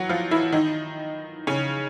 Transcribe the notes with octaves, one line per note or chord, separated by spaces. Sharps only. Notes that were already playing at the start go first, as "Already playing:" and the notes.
Already playing: E3 F#3 F#4
F3 F4
E3 E4
D#3 D#4
C#3 C#4